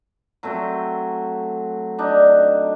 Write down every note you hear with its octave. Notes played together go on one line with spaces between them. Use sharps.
F#3 A3 C4
D4 D#4